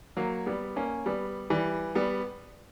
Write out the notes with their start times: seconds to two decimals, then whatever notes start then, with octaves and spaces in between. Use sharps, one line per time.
0.17 F#3 A#3
0.46 G3 B3
0.76 A#3 C#4
1.06 G3 B3
1.50 E3 G3
1.95 G3 B3